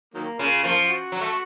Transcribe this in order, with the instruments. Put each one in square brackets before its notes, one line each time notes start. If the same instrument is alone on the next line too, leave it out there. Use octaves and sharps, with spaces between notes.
[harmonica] D#3 F#3 A#3
[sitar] C#3 [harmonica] A#3 F4
[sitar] F3 [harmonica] A#3 F4
[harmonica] F#4
[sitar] F#3
A3